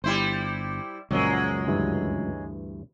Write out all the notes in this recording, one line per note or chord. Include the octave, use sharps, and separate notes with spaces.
G1 G3 E4 C5
C#2 F#2 A#2 F3 F#3 G#3 D5
D2 G2 E3